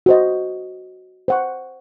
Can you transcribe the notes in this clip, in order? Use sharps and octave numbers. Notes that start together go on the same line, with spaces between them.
F#4 C5 D#5
C5 F#5 C#6